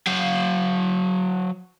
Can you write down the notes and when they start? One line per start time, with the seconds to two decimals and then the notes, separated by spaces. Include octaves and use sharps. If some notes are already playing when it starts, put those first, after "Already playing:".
0.07 F#3 F5